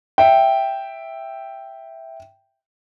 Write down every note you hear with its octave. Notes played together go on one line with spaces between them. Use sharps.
E5 G5